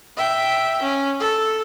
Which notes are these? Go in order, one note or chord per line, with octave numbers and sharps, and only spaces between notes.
E5 G5
C#4
A4